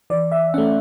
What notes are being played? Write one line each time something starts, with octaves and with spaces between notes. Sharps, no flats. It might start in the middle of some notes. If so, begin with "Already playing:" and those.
E3 D5
E5
A3 C#4 F#5